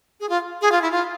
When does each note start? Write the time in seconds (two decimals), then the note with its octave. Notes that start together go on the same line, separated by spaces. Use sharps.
0.20 G#4
0.29 F4
0.61 G#4
0.72 F4
0.82 E4
0.92 F4